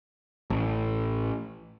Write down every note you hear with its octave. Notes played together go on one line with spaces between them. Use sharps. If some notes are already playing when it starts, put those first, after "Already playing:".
A1